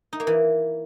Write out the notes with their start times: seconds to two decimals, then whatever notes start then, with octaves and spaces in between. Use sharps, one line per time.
0.13 D#4
0.20 A#3
0.27 E3